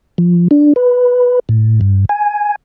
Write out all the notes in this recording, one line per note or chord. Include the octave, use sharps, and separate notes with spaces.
F3
D4
B4
A2
G2
G#5